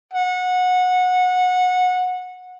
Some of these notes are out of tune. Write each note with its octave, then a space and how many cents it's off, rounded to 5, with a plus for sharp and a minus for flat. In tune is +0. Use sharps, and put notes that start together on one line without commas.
F#5 -20